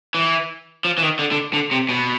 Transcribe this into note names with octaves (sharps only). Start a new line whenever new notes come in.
E3
F3
E3
D#3
D3
D3
D3
C3
B2